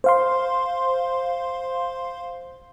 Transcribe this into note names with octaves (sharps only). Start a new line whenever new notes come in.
C5 F5 C6